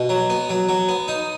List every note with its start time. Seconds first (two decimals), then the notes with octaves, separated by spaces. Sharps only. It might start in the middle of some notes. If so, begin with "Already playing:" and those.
Already playing: B2
0.09 F#3
0.30 B3
0.49 F#3
0.69 F#3
0.88 B3
1.08 D#4